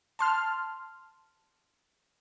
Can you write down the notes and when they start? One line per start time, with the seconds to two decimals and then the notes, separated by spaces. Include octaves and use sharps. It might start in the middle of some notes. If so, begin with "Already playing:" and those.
0.19 A5 C6 F6